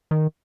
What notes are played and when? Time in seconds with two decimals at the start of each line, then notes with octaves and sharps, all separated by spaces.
0.11 D#3